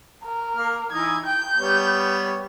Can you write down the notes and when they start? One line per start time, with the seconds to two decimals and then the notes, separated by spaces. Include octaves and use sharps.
0.23 A#4
0.57 A#3 F6
0.92 E3 D#4 D#5 G#6
1.26 G5 G6
1.57 G3 B3 C#5